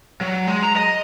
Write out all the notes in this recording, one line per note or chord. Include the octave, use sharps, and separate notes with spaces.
F#3
G#3
A#5
D#5